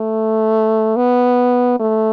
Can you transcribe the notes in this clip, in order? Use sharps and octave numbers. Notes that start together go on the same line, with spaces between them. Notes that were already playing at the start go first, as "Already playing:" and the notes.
Already playing: A3
B3
A3